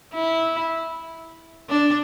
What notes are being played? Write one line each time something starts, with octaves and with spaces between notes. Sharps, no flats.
E4
D4